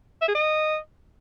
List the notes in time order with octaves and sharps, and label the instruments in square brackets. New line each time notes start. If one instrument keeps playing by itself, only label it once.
[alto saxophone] E5
G#4
D#5